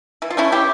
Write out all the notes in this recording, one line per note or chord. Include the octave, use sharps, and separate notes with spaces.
E3 E4
F4
A3 C#4 E4
E3 E4 G4